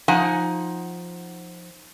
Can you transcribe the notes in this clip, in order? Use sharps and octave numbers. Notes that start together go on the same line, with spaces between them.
F3 D#4 F#5 G#5